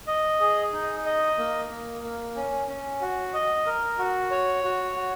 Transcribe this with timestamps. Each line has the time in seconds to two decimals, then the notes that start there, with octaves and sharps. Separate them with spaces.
0.07 D#5
0.40 G#4
0.73 D#4
1.06 D#5
1.38 A#3
1.70 A#3
2.03 A#3
2.36 C#4
2.68 C#4
3.01 F#4
3.34 D#5
3.66 A#4
3.99 F#4
4.31 C#5
4.64 F#4
4.96 F#4